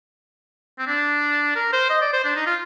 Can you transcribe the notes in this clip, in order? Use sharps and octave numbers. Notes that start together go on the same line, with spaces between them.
C4
D4
A#4
C5
D#5
D5
C5
D4
D#4
F4